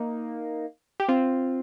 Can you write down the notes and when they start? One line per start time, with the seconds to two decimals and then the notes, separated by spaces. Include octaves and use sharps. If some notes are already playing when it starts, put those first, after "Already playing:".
Already playing: A#3 D#4
1.00 G4
1.08 C4 F4